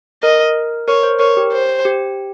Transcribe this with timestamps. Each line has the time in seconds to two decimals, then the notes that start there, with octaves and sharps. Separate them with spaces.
0.23 A#4 D#5
0.88 A#4 C#5
1.03 C5
1.19 A#4 C#5
1.37 G4
1.53 C5
1.85 G4